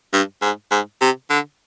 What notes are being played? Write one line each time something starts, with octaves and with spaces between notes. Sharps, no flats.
G2
G#2
G#2
C3
D3